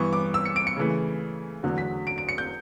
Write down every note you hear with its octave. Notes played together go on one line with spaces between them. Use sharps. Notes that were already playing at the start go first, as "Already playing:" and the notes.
Already playing: G2 E3 B3 C#6
D6
E6
C#7
D7
C#7
C#3 E3 A3
E2 D3 F#3 A3
B6
D7
D7
C#7
G6